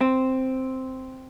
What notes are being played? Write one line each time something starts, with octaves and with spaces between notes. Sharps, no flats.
C4